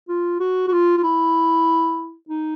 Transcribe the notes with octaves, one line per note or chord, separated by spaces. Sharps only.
F4
F#4
F#4
F4
F4
E4
D#4